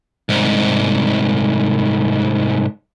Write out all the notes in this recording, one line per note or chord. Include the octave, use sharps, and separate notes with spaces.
C2 G#2